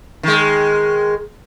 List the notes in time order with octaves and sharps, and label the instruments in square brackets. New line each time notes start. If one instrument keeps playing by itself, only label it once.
[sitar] D#3 G#3